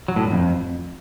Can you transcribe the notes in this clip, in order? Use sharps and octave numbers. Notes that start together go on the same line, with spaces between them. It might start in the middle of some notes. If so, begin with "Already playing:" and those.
F#3
A2
G2
F2